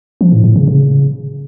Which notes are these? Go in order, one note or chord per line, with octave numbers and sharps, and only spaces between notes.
F3
A2
A2
C#3
C#3